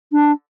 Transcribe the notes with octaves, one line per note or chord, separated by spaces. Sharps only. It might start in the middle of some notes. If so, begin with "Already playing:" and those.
D4